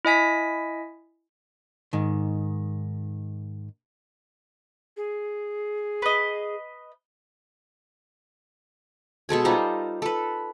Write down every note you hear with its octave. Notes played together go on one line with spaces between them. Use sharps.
E4 D#5 G#5 B6
G#2 D#3
G#4
B4 D#5
B2 G#3 A4 G#5
G3 D#4 F4 C5
A4 B4